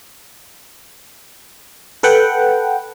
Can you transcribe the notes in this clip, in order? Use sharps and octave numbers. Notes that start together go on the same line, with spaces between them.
A4 B4 F#5 G5